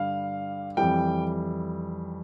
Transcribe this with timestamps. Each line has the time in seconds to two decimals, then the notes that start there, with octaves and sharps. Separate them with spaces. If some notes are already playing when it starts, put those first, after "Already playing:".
Already playing: G2 D3 G3 F5
0.77 F2 E3 G3 G5